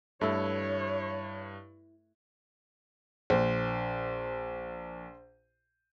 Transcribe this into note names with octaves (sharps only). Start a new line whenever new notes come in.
G2 A3 E4 C#5
A#1 C5